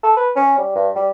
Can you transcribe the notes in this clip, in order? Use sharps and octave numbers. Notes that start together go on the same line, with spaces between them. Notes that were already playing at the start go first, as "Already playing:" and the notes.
A4
B4
C#4
G3
G2
G3